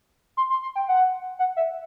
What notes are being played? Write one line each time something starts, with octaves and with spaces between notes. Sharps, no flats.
C6
C6
C6
G5
F#5
F#5
E5